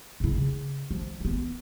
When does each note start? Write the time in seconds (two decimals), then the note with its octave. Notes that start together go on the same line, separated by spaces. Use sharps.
0.20 C#3 E4
0.37 C#3
0.91 F3
1.20 E3 B3